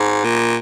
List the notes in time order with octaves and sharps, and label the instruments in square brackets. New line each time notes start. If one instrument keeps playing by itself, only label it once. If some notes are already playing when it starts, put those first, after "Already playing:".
Already playing: [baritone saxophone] G#2
A#2